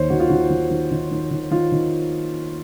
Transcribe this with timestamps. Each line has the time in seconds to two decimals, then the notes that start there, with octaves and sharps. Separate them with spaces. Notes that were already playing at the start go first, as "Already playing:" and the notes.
Already playing: D#2 D#3 C5 C#5
0.10 D#3 F#4
0.20 F4
0.29 D#3 F#4
0.50 D#3
0.71 D#3
0.91 D#3
1.11 D#3
1.31 D#3
1.51 D#3 F4
1.72 D#3